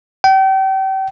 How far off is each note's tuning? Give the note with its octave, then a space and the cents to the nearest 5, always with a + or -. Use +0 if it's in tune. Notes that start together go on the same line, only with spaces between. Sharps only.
G5 -35